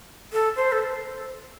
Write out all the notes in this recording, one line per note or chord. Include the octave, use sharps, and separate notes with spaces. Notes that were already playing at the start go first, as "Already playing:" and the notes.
A4
C5
A4